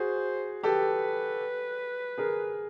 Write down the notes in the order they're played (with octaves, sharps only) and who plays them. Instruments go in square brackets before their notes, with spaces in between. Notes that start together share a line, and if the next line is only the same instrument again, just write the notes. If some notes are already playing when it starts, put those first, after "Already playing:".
Already playing: [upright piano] F#4 G#4 [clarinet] C5
[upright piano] G4 A4 [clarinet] B4
[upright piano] G#4 A#4